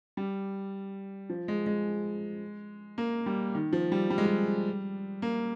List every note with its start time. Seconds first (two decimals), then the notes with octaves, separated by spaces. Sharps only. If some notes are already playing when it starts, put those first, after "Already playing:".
0.17 G3
1.30 F3
1.48 G#3
1.66 G#3
2.98 A#3
3.26 G3
3.55 D#3
3.73 F3
3.92 G3
4.10 G3
4.18 G#3
4.26 G3
5.22 A#3